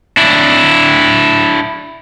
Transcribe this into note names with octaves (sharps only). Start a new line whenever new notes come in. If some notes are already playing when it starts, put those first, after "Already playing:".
D4 E4